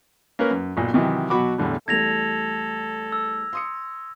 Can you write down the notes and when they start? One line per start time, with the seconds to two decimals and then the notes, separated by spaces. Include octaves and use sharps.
0.39 A#3 C#4 A#4 B4
0.51 F#2
0.77 B1 A#2
0.94 C3 D#3 E3 F#3
1.30 B2 F#3 F#4 B5 D6
1.58 E2 A2 D3 G3
1.88 E2 G3 A3 A4 G#6 A#6 F7
3.12 E6
3.53 C6 D#6 C#7